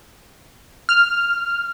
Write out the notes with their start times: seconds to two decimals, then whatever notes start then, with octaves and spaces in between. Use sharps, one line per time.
0.89 F6